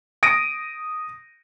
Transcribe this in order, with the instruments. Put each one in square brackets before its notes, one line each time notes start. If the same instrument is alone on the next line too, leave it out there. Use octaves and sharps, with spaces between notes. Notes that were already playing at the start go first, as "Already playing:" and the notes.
[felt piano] D#6 A#6 D7 D#7